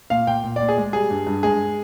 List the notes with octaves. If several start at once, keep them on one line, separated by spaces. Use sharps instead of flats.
A#2 F5
A#2 G5
A#2
A#2 D5
G#4
G#3
G3 G#4
G2
G2
G#3 G#4